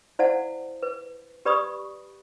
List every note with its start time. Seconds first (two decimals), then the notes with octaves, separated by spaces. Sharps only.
0.19 E4 C5 D5 F5 F#5 A5
0.83 B4
1.45 G4 B4 D5 B5 C#6 D#6